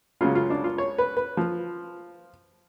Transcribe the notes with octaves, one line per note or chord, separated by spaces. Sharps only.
C#2 C#3 F#3 C#4 F4
F4
D4
F4
C#5
B4
B4
F3